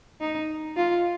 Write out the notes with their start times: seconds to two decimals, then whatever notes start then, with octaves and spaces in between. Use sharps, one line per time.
0.21 D#4
0.76 F4